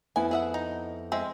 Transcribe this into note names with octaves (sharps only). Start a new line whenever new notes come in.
F2 B3 E4 G#5
G#4 E5 F#5
D#4
G#3 C4 E5